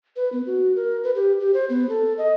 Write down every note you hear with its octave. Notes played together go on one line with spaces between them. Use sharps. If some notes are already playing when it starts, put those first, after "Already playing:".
B4
B3
F#4
A#4
B4
G4
G4
C5
B3
A4
D#5